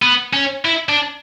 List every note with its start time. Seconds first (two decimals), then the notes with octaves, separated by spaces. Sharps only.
0.02 B3
0.33 C#4
0.65 E4
0.89 D4